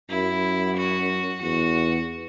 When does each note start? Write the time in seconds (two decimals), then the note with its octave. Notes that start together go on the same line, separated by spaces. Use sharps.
0.10 F#2 E4
0.77 F#4
1.42 E2 F#4